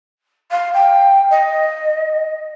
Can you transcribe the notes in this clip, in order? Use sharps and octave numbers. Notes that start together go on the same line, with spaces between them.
F5
G5
D#5